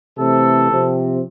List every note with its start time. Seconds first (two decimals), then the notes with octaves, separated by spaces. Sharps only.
0.18 C3 E3 A3 C4 A4
0.70 C3 F3 C4